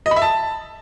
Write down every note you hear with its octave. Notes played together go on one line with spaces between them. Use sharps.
D#5
B5
E5
A5